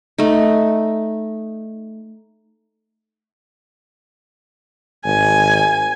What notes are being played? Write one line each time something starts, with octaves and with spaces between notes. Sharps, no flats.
A3 D#4
G#1 G#5